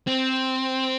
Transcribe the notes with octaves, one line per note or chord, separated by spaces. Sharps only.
C4